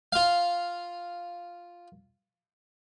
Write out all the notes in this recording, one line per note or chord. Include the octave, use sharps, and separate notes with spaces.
F4 F5